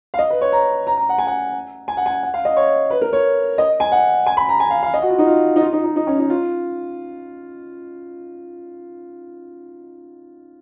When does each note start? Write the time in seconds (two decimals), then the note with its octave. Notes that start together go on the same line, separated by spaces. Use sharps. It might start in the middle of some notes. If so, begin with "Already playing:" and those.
0.14 F5
0.19 D#5
0.30 B4
0.41 C#5
0.52 A#5
0.87 A#5
0.97 A#5
1.09 F#5
1.18 G#5
1.27 F#5
1.88 G#5
1.97 F#5
2.06 G#5
2.23 F#5
2.34 F5
2.45 D#5
2.57 C#5
2.90 B4
3.01 A#4
3.13 C#5
3.58 D#5
3.80 G#5
3.92 F#5
4.26 G#5
4.37 B5
4.49 A#5
4.60 G#5
4.70 F5
4.83 F5
4.94 D#5
5.02 F#4
5.10 F4
5.19 D#4
5.27 F4
5.56 D#4
5.61 F4
5.73 D#4
5.84 D#4
5.96 D#4
6.07 C#4
6.19 D#4
6.30 F4